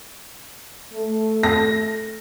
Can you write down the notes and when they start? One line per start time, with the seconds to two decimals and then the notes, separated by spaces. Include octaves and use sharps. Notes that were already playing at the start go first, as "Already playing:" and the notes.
0.94 A3
1.43 A#6